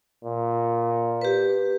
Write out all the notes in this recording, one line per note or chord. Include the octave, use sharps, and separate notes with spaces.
A#2
G4 B4